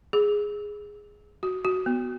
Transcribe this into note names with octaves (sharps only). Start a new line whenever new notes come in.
G#4
F#4
F#4
B3